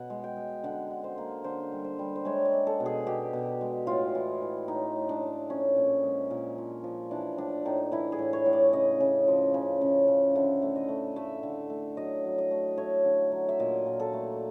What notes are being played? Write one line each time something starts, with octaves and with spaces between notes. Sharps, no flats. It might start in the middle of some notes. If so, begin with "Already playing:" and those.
Already playing: B2 F#5
G#3
G5
G#3
D3 F#5
D3
C5
A#3
D3 C5
G3
C5
G3
C5
G#3 C#5
D5
G#3
A4
B2
G#4
B2 G4
B2
G#3
A2 F4
E3
E3
A2 D#4
A2
D4
A3
F3 C#4
A#2
G#3
A#2
F3
F3
E3 D4
A2 D4
A2 D#4
E3 E4
G#4
A2
C#5
A2
D5
C#3 D#5
C#3
F3
C#3
C#3
C#3
D3 E5
A3
D#5
A3
A3 E5
D3
A3
F#3 D#5
F#3
D#5
A3
A3 C#5
D3
F#3
E5
A#2 D#5
A#2
A4
A3